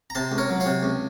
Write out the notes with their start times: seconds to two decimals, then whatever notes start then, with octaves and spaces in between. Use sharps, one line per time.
0.10 A#5
0.15 C3 A5 C6
0.32 C#2
0.38 A#4 C#5
0.50 F#3
0.60 C#5 F5
0.66 C3
0.83 C#2